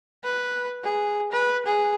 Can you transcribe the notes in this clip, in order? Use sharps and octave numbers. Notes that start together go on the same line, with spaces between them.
B4
G#4
B4
G#4